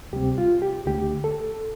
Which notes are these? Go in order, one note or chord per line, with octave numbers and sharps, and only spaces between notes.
D2 C3 G3 C4 G4
F4
G4
D2 D3 A3 G4
A4